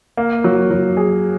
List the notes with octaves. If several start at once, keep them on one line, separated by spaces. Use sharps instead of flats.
A#3
F#3
F#3
G#4